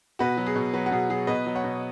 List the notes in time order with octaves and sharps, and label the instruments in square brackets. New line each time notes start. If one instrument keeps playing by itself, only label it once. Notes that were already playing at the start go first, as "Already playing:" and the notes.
[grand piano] B2 F#4 B4
F#3
G#4
B2
F#3 F#4 B4
F#4
B2 G#4
F#3 G#4
B2 B4 D#5
F#3
C#5 F#5
B2